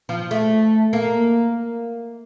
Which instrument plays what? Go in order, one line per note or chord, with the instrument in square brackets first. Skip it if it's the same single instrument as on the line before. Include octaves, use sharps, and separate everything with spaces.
[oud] F3
A3
A#3